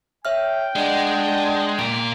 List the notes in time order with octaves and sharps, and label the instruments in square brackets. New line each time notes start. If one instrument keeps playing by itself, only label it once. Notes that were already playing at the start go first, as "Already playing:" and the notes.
[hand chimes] C#5 E5 F6 [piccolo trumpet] G5
[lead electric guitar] G#3 [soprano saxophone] D4 [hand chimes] D5 D#5 F#5
[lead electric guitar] A#2 A#4 [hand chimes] D7